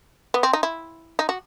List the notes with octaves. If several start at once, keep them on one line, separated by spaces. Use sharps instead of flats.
B3
C4
D#4
E4
D#4
F#4